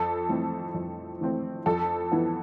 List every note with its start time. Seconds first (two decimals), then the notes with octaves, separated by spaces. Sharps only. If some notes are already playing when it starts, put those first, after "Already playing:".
Already playing: F2 A4
0.29 E3 A3 C4
0.74 F2
1.21 E3 A3 C4
1.66 F2 A4
2.12 E3 B3